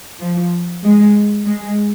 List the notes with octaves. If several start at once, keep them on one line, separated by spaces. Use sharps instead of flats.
F3
G#3
G#3